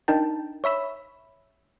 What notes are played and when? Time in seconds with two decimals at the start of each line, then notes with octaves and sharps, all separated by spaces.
0.08 D4 D#4 A#4 G5 A5
0.64 C#5 E5 B5 E6